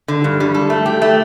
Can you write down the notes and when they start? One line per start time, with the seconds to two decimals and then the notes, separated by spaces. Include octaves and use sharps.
0.08 D3
0.24 G2
0.40 G3
0.54 A4
0.70 A3
0.86 G4
1.02 A3